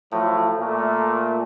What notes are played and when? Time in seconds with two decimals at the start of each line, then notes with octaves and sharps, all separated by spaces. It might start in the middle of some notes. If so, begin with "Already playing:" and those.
0.11 A2 F3 F#3 A3
0.58 A#2 A3